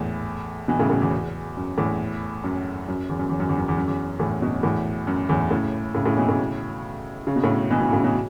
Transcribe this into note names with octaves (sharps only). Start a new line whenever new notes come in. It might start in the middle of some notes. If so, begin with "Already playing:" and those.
Already playing: E2 A2
B2 E3
A2 C#3
A2 C#3
E2
F#2
E2 A2
F#2
F#2
E2
F#2
E2
F#2
E2
F#2
E2
F#2
E2
E2 A2
F#2 B2
E2 A2
F#2
E2 A2
A2 C#3
A2 C#3
A2 C#3
B2 E3
A2 C#3
C#3
B2
A2 C#3
B2 E3
B2 E3
A2 C#3
B2 E3